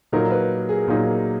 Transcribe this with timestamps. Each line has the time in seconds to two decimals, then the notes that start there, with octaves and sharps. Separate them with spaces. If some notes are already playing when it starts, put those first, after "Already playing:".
0.12 A#2 F#3 A#3 D#4 A#4
0.31 B4
0.69 G#4
0.88 A#2 F#3 A#3 D#4